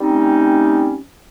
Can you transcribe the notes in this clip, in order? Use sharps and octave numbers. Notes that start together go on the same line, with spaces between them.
G3 A3 C4 C#4 D#4